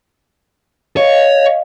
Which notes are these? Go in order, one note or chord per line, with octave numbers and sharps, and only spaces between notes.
C#5 D#5 F5